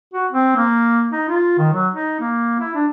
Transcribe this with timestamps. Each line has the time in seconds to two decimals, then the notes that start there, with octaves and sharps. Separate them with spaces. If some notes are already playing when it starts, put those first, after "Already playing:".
0.14 F#4
0.32 C4
0.56 A#3
1.12 D#4
1.28 F4
1.58 D#3
1.73 F#3
1.94 D#4
2.20 A#3
2.60 E4
2.75 D4